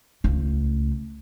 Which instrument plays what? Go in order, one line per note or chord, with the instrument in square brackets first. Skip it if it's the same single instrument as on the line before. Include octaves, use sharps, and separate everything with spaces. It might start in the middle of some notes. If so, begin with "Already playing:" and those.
[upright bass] C#2 A3